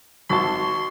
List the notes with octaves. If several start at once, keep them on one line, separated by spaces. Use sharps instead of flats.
G#1 F#4 A5 C6